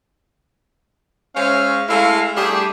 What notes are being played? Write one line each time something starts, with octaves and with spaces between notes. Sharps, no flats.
G#3 C#4 C5 C#5 E5 F5
G#3 A3 E4 A4 F5
G3 A3 D4 G4 G#4